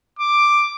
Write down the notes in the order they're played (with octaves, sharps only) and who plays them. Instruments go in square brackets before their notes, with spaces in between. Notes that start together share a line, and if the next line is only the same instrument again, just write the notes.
[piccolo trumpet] D6